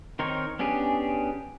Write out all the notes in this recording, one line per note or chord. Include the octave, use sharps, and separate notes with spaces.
D#3 C4 D#4 A#4 C#5
B3 C#4 D4 G4 G#4